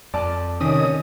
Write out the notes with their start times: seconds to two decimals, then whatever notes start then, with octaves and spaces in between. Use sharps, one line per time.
0.14 F2 D5 A5
0.61 C3 D#3 C#4 D#6